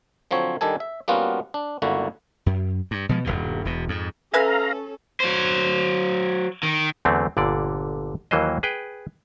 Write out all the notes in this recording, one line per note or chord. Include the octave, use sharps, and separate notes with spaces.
D3 F3 F#3 C4 C#5
D#3 G3 D4 A4 G#5
E5
G3 A#3 B3 C#4 F4 F#4
D4
G1 C#2 D3 A#3 E4 F#4
F#2
G2
B2 F3 G#3
D#1 G#1 G2 B2
E1 B2
F2 G#2
C#4 A4 B4 E5 F5 G#5 A#5
F#3 C5
D#3
E2 D3 F#3 A3 C4
G1 A#2 D3 D5
D#2 E3 F#3 A#3 C5 D#5
G#4 B4 G5